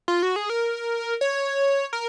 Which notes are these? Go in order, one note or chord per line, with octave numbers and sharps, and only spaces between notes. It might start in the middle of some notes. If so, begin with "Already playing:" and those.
F4
F#4
G#4
A#4
C#5
A#4